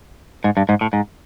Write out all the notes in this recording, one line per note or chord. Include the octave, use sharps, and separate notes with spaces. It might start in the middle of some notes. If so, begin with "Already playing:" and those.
G#2
G2
G#2
A2
G#2